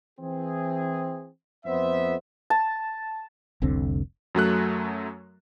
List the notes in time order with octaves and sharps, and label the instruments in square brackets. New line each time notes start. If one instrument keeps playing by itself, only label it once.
[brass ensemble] E3 C4 G#4
F2 B3 C5 E5
[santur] A5
[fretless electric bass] F1 C2 D3 C4
[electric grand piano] F#2 F#3 A3 F#6